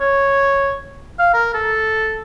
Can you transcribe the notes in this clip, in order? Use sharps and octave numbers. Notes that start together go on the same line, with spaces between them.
C#5
F5
A#4
A4